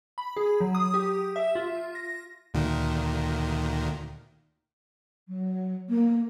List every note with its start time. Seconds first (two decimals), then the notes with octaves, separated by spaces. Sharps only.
0.18 B5
0.37 G#4
0.60 F#3
0.75 D#6
0.94 G4
1.36 E5
1.55 F4
1.95 A#6
2.54 D2 A#2 D#3
5.28 F#3
5.89 A#3